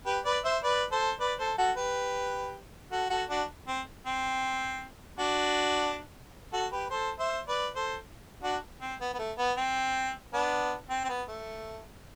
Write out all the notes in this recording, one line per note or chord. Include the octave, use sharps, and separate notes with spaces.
G4 B4
B4 D5
C5 E5
B4 D5
A4 C5
B4 D5
A4 C5
F#4 A4
G4 B4
F#4 A4
F#4 A4
D4 F#4
C4
C4
D4 F#4
F#4 A4
G4 B4
A4 C5
C5 E5
B4 D5
A4 C5
D4 F#4
C4
B3
B3
A3
B3
C4
B3 D4
C4
C4
B3
A3